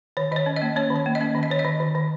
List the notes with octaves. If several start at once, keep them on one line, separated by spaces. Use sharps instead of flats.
D#3 C#5
D#3 C#5 D#5
C#4
D#5
A#3
C#4 C#5
D#3
C#5
A#3
D#5
C#4
D#3
D#5
D#3 C#5
D#5
D#3
D#3
D#3